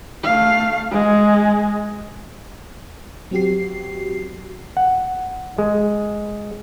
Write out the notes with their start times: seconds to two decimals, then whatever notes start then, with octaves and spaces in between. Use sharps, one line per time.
0.24 A3 F5
0.91 G#3
3.31 F#3 C4 F#4 G4 C7
4.77 F#5
5.58 G#3